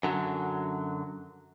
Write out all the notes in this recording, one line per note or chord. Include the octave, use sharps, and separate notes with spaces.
F#2 D3 F#3